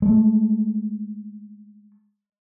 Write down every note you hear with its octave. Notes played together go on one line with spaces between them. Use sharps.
G#3 A3